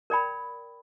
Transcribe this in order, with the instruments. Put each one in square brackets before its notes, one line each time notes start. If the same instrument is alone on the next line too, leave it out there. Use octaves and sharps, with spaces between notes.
[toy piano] A#4 D5 G5 B5